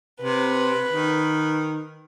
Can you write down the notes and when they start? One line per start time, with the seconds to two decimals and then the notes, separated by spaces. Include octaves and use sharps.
0.22 C3 B4
0.90 D#3